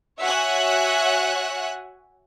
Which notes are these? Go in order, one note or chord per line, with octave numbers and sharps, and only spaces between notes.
F#4 C#5 E5 F#5 G#5 F#6